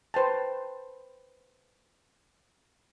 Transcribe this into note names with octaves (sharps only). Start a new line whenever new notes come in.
B4 C5 G5 A5